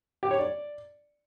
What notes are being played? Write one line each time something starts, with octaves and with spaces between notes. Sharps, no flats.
G4
C#5
D5